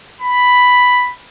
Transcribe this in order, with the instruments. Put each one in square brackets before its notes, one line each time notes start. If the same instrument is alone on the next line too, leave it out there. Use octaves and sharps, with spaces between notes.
[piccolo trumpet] B5